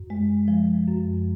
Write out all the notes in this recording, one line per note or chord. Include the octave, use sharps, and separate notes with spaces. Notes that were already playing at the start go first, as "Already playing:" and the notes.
Already playing: F#2
G#3
F3
F#2